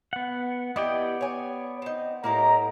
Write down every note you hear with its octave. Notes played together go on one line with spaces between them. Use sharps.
B3 F#5
B3 E4 G4 D5 D#5 G5
C#5 G#5
C4 D#4
A2 A#3 E4 G4 D#5 A#5